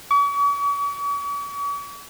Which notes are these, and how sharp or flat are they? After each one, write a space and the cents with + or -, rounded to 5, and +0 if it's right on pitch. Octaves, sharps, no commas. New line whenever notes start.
C#6 +45